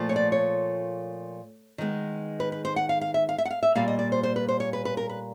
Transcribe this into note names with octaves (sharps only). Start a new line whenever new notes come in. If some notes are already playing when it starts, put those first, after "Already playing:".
Already playing: A#2 F3 A3
C#5
D5
C#5
D#3 G#3 B3
B4
B4
C5
F#5
F5
F5
E5
F5
E5
F#5
F5
E5
A#2 G3 A#3 F5
D#5
D5
C5
C5
B4
C5
C#5
B4
B4
A#4
B4